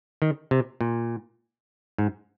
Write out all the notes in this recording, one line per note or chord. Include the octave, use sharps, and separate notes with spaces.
D#3
C3
A#2
G#2